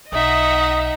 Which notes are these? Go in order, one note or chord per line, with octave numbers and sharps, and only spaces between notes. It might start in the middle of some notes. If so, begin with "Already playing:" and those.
B1 D#4 D#5 E5 F#5 D#6